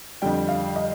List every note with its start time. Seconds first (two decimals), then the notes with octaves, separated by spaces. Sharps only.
0.22 F2 D3 G3 G5
0.49 F5
0.76 D#5